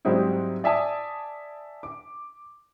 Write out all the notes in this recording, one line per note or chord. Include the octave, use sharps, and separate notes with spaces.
G#2 F#3 G3 C4 D#4 E4
D5 E5 G#5 A5 D#6
D6